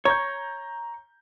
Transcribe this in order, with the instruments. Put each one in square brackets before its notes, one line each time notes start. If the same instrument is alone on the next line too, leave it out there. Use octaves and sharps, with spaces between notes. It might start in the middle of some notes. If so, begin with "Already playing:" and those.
[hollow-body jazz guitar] C#5 [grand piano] A#5 G6